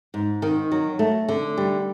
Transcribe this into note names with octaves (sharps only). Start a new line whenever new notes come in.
G#2
D#3
F#3
A3
D3
G3